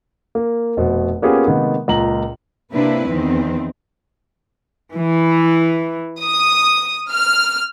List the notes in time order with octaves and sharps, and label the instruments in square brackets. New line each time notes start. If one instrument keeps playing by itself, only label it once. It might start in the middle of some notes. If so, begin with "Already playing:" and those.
[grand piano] A#3
F1 B2 C5
A#3 B3 C#4 F4 G4 G#4
C3 D#3 G#3 A#3 B3
C#2 A#2 A#5 F#7
[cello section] C3 A#3 D4 E4 B4
E2 D#3 C4
[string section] E3
D#6
F6